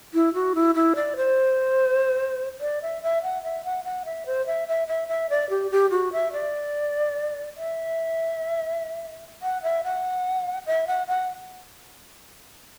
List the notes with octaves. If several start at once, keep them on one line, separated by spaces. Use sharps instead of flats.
E4
F#4
E4
E4
D5
C5
D5
E5
E5
F#5
E5
F#5
F#5
E5
C5
E5
E5
E5
E5
D5
G4
G4
F#4
E5
D5
E5
F#5
E5
F#5
E5
F#5
F#5